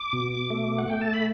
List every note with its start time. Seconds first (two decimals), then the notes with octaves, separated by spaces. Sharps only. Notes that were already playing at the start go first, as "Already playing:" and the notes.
Already playing: D6
0.13 B2
0.50 A3
0.78 F#5
0.88 A3 G5
1.01 A5
1.14 B5